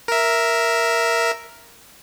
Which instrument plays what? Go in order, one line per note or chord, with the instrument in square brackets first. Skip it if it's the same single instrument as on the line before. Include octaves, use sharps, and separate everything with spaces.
[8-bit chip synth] A#4 E5